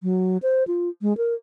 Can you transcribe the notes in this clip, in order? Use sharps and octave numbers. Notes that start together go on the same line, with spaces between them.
F#3
C5
F4
G#3
A#4